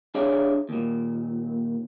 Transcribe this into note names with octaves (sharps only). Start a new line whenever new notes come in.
D4 G#4 C#5 D5 E5 F5
D#2 A#2